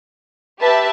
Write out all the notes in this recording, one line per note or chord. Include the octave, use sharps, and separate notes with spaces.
G4 B4 E5 A5